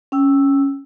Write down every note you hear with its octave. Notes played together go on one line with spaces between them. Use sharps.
C#4 G5 E6